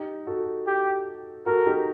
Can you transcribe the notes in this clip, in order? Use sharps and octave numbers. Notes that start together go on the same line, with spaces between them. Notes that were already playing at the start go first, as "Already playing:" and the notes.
Already playing: D#4 G4
F#4 A4
G4
F#4 A4 A#4
D#4 G4